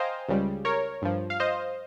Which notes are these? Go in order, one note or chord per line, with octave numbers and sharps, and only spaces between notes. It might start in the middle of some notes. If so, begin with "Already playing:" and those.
Already playing: C5 D#5 F5 G5 G#5 A#5
C#2 C#3 G3
A#4 C#5
G2 F3
F5
C5 D#5